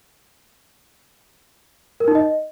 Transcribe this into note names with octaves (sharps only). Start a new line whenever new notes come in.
A#4
D#4
D#5